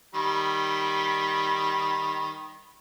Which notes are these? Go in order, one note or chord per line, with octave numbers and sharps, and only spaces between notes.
D#3 G3 B5